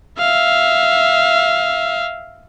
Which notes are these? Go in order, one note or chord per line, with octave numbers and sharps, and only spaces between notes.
E5 F5